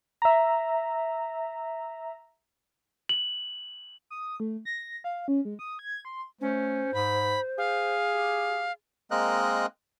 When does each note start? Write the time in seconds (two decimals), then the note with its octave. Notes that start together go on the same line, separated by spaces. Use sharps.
0.22 E5 A#5
3.09 F#7
4.10 D#6
4.40 A3
4.65 A#6
5.04 F5
5.28 C#4
5.45 G#3
5.59 D#6
5.79 G#6
6.05 C6
6.41 A3 C#4 C5
6.94 G#2 B5
7.58 G#4 F5
8.12 G4
9.11 G#3 A#3 C4 A#4 D#5 F#6